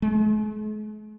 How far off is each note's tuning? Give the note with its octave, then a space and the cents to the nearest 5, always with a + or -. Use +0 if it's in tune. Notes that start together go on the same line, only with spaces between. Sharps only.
G#3 +45